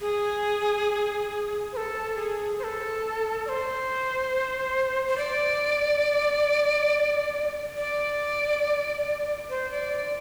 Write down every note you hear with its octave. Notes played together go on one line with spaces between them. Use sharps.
G#4
C5
A4
G#4
C5
A4
D5
C5
C5
D5
D5
C5
D5
D5